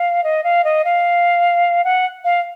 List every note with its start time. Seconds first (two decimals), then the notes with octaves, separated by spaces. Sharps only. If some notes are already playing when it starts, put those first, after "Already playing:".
Already playing: F5
0.24 D#5
0.44 F5
0.64 D#5
0.85 F5
1.85 F#5
2.24 F5